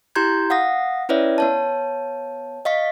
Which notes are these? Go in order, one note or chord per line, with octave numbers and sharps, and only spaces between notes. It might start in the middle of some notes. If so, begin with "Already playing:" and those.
E4 G4 A#5 C6 G6 G#6
F5 F#5 D#6 A#6
C#4 E4 B4 C#5 D5 E5
B3 C#5 A5
D#5 F5 C#6 B6